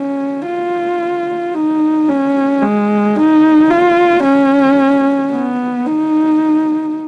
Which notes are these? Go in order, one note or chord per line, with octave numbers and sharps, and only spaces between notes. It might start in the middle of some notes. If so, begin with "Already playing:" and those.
Already playing: C#4
F4
D#4
C#4
G#3
D#4
F4
C#4
B3
D#4